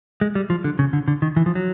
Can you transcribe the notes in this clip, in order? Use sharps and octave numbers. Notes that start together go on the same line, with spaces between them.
G#3
G3
F3
D3
C#3
D3
D3
D#3
E3
F3
F#3